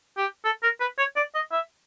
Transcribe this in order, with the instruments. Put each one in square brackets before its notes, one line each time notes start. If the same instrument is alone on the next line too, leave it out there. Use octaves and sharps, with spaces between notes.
[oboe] G4
A4
A#4
B4
C#5
D5
D#5
E5